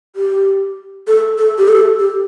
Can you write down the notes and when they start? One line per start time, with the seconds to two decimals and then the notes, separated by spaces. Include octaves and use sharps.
0.16 G4
1.08 A4
1.38 A4
1.58 G4
1.68 A4
1.99 G4